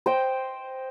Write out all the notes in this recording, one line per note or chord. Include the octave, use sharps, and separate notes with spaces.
C5 D#5 G5